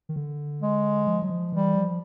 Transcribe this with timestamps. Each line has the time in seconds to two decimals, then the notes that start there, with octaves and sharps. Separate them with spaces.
0.09 D#3
0.16 D3
0.62 G#3
1.07 F3
1.22 F#3
1.30 F3
1.52 E3 G3
1.75 F3